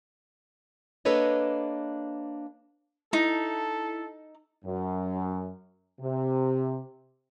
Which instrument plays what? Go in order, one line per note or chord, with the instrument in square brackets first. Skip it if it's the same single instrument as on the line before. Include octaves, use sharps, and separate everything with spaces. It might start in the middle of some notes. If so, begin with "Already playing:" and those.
[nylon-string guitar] A#3 D4 A4 B4 C#5 D#5
[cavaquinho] D#4 [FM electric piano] E4 A5 [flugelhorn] A4
[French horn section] F#2
C3